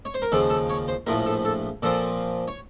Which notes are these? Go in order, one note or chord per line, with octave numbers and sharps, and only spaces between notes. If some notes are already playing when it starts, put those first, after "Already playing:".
C#5
C5
A#4
D#2 C#3 F3 A4
A4
C#5
C5
A#1 A2 F3 A#4
A4
A4
A#2 F3 C4 A4
C#5